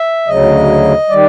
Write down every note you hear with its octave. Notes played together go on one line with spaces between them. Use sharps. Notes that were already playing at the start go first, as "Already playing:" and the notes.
Already playing: E5
D2 C#3 F#3 D#5
D#3 G3 D5